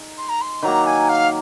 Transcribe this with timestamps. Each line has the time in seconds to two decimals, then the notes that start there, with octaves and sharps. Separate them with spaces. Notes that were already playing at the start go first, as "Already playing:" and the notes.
Already playing: D#4 G#4
0.17 C6
0.29 A#5
0.41 C6
0.63 D#3 F#3 A#3 A#5
0.86 G#5
1.08 F5